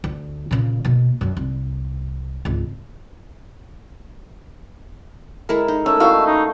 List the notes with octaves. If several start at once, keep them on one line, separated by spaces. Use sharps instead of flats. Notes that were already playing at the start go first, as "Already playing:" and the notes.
D2
A#2 C#3
B2 A#3
F#2 G3
C2
G#1 C#2
G#3 E4 A4 A#4
D#4
A3 C#4 E6
E4 F#4 D#5 F5 A5
D#4